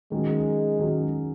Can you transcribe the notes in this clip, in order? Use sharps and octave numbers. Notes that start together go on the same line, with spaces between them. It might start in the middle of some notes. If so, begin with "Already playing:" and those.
D#3 F#3 G#3 C#4 G#4
D#3 F#3 C#4 G#4